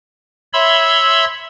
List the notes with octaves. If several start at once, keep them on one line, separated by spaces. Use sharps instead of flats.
C#5 E5 B5 C6 E6